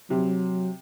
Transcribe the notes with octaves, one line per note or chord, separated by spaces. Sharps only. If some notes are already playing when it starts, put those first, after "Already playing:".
C3 F#3